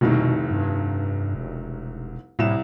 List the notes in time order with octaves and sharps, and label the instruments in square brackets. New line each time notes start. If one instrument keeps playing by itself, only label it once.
[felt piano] F1 C2 D#3 [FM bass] B2
[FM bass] G2
E1
[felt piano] C2 E5 E7 [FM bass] A2